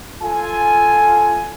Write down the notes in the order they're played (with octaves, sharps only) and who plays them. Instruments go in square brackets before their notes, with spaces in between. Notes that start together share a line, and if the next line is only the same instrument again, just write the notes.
[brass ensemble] F4 A4 G#5